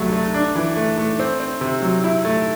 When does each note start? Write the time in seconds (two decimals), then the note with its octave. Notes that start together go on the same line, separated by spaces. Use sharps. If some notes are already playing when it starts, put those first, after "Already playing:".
Already playing: C2 C3 F#3 A3
0.13 A3
0.34 D4
0.55 E3
0.76 A3
0.98 A3
1.19 C4
1.40 C4
1.61 C3
1.82 F#3
2.04 E4
2.25 A3